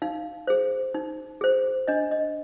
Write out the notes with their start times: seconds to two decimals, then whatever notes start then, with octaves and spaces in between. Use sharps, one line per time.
0.02 D#4 F5
0.47 G#4 C5
0.94 D#4
1.41 G#4 C5
1.88 D4 D#5
2.11 D#5